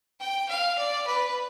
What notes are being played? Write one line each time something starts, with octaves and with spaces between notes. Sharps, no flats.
G5
F5
D5
B4